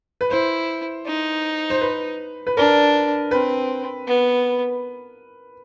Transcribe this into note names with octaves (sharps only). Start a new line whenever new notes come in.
B4
E4 C5
D#4
C5
B4
B4
D4 A#4
C4 B4
B3